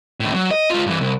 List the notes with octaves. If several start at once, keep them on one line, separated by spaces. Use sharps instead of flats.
D#2 A2
F#3
D#5
G#3 F4
G2 E3
C2